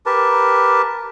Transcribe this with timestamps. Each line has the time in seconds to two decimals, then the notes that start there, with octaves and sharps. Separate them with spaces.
0.06 G4 A#4 B4 A5